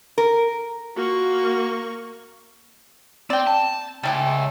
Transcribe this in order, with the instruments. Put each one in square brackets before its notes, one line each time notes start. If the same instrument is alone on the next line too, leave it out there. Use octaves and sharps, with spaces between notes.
[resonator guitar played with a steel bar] A#4
[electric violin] A#3 C#6 [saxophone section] F4 F#4
[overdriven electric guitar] C4 [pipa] D5 G5
[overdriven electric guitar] A5
[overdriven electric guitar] C#2 [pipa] G3 A3 G4